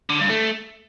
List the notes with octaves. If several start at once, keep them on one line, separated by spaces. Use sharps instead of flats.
D3
G2
A3